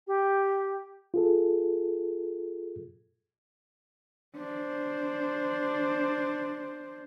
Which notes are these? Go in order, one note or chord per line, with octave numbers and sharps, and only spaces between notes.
G4
F4 G#4 A4
D4 C5